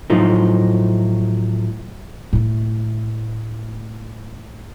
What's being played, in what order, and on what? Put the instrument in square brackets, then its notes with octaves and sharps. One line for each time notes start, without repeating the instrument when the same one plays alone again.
[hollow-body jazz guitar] A2 F3 F#3 A3 D#4
[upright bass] A2 A3